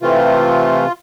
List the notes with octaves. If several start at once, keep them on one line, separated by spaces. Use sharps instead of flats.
C3 E3 A3 C4 F4